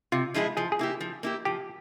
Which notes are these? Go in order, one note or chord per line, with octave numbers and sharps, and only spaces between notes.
C3 F4
F3 G#3 E4 G#4
F3 G#4
G#4
A#3 E4 G4
F3
A#3 E4 G4
F3 G4